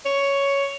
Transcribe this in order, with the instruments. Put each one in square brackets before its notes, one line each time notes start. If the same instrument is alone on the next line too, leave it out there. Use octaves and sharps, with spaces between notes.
[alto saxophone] C#5